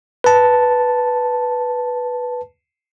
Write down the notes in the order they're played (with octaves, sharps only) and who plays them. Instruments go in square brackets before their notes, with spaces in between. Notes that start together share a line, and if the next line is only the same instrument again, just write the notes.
[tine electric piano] B4 A5